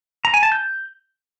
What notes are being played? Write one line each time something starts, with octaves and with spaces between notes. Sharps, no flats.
A#5
G#5
A5
G6